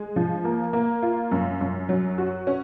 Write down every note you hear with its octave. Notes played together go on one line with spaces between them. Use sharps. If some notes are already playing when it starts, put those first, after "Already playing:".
Already playing: G#3
F3
A#3
A#3
F4
F#2
F#2
F#3
F#4
C#4